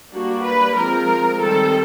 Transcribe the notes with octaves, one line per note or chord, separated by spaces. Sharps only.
G3 A#3 D4 F#4
B4
F3 G#3 C4 A#4
D#3 G3 C4 A4